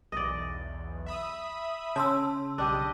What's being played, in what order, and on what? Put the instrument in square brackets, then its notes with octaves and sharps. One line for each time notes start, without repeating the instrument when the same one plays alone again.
[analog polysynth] B1 E2 [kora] D5 D#5
[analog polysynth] E5 B5 D#6
[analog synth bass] C#3 [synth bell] A5 C6 E6
[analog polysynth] B1 G3 D#5 [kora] D4 G4